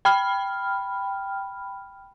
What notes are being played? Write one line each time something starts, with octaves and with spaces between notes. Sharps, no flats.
G5 B5 F6